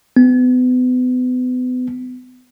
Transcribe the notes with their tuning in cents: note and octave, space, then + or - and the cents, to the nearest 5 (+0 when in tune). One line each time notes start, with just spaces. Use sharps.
B3 +35